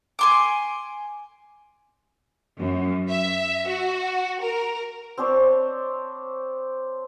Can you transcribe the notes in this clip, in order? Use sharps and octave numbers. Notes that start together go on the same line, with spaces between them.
G#5 C6 D6
F#2
E5
F#4
A#4
C4 D4 C5 C#5